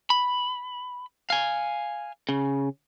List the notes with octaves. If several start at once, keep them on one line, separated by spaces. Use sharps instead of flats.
B5
F5 G#5
C#3